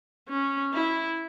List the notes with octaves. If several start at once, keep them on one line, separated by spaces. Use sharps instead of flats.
C#4
E4